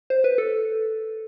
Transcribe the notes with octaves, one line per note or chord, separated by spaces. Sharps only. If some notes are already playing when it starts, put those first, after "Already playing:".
C5
B4
A4